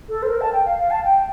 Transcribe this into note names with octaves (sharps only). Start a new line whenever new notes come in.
A4
C5
A#4
A5
G5
F5
F5
A5
G5